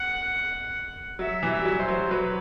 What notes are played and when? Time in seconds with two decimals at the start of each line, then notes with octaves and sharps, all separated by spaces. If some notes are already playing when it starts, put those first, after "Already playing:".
Already playing: F#5
1.19 F#3 E5
1.43 E3
1.50 E5
1.59 G3
1.65 F#3
1.80 C5
1.88 F#3
2.10 F#3 B4